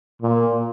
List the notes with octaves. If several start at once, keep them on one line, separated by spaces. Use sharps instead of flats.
A#2